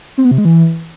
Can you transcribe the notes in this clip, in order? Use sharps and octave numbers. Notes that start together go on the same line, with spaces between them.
C4
B3
C3
G#3
E3